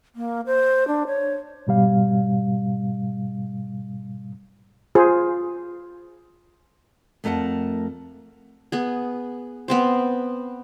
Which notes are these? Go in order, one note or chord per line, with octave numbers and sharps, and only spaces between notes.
A#3
C5
D4
C#5
G#2 B2 G3 F5
F4 G#4 C5
F2 A3 A#4 F#5 A5
B3 G#4
B3 C4 C5